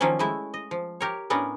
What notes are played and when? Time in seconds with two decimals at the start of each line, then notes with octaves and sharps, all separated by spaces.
0.01 D#3 F3 F#3 A#3 C#4
0.19 G#3 A3 E4 E5
0.54 D#5
0.71 F3
1.01 G4 A#4 C#5
1.30 A2 B3 C#4 D4 A#4 F#5